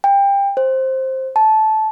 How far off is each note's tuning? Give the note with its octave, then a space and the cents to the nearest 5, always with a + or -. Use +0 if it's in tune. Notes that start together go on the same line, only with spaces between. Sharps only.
G5 +25
C5 +10
A5 -15